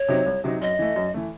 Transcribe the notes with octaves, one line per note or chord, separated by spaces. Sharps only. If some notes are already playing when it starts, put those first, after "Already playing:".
Already playing: C#5
C3 F#3 C4 D#4
C2
C3 F#3 C4 D#4
F#2 D#5
E3 A3
F#2
E3 A3